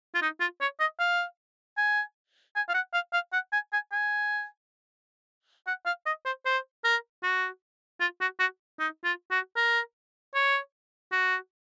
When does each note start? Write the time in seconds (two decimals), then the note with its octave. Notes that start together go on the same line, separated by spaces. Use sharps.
0.15 F4
0.22 D#4
0.40 F4
0.61 C#5
0.80 D#5
1.00 F5
1.77 G#5
2.56 G#5
2.69 F5
2.74 F#5
2.94 F5
3.13 F5
3.33 F#5
3.53 G#5
3.73 G#5
3.92 G#5
5.67 F#5
5.86 F5
6.06 D#5
6.26 C5
6.46 C5
6.84 A#4
7.23 F#4
8.01 F4
8.21 F#4
8.40 F#4
8.80 D#4
9.05 F4
9.31 F#4
9.57 A#4
10.35 C#5
11.12 F#4